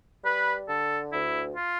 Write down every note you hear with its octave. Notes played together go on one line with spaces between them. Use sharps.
G3 B4
D3 A4
D2 E4
F4